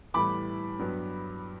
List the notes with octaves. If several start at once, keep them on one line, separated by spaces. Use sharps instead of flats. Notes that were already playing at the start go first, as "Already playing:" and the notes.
A2 E3 G3 B3 B5 D6
G2 F#3 B3